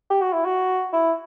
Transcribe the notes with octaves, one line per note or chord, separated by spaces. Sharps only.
G4
F#4
E4
F#4
E4